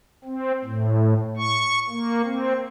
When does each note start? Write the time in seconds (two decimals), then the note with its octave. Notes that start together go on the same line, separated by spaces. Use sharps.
0.24 C4
0.64 A2
1.37 C#6
1.89 A#3
2.25 C4